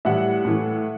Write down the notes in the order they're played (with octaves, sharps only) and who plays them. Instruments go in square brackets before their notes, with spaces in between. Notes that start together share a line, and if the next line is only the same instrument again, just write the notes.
[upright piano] A2 E3 G3 E5 F#5
A2 E3 A3